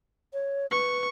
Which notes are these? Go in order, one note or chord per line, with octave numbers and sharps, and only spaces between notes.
C#5
B4 C#6